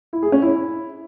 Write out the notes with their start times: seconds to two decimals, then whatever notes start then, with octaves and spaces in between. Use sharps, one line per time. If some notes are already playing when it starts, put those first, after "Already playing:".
0.13 E4
0.23 G#4
0.32 C#4
0.42 E4